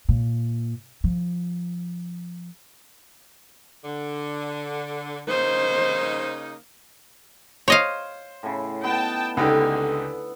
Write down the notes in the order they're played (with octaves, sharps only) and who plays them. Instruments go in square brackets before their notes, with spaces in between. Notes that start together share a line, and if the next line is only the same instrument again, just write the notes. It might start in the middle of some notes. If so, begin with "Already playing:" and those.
[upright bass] A#2
F3
[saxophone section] D3
[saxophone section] C#3 A#3 D#4 [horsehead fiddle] C5
[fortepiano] C5 [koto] C#5 D#5 F5
[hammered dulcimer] A2 C#3
[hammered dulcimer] B3 D#4 [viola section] G5 A5
[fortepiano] C#2 D#4 G4 [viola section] D3 [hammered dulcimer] B3 E5